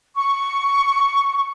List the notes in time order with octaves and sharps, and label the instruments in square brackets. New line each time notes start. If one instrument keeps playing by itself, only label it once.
[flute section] C#6